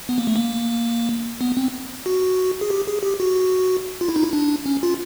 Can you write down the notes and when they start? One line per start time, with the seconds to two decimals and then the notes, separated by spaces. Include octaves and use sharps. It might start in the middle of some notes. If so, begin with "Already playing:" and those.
0.09 B3
0.18 A#3
0.27 A3
0.36 A#3
1.41 B3
1.57 C4
2.06 F#4
2.61 G#4
2.70 G4
2.87 G#4
3.03 G4
3.20 F#4
4.01 F4
4.08 E4
4.16 D#4
4.23 E4
4.33 D4
4.66 C#4
4.83 F4